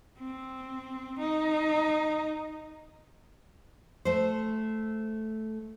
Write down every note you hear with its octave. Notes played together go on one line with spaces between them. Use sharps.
C4
D#4
A3 C5